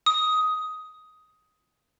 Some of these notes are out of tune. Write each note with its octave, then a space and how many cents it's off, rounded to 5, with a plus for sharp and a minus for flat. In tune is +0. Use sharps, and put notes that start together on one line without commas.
D#6 +10